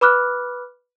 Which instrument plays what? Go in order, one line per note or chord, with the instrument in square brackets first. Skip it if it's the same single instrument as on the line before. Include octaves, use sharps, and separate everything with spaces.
[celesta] B4 B5 D6 F6 F#6